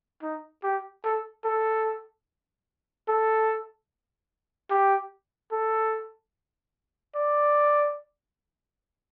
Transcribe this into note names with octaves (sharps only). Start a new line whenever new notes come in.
D#4
G4
A4
A4
A4
G4
A4
D5